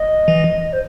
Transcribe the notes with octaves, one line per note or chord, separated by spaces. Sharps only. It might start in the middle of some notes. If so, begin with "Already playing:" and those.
Already playing: D#5
E3
C5